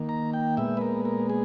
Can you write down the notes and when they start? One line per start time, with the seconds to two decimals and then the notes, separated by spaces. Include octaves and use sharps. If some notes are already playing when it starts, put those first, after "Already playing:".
Already playing: D#3 A#3
0.09 A#5
0.33 G5
0.57 A#2 G#3 B3 E5
0.77 B4
0.81 A#4
1.05 A#4
1.30 G#4